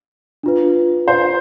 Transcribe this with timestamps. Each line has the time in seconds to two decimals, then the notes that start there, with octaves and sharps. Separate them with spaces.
0.43 D4 F4 B4
1.08 C5